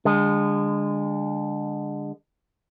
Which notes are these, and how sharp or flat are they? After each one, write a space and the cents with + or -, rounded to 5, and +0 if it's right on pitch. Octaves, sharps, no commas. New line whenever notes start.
D3 +0 G#3 -30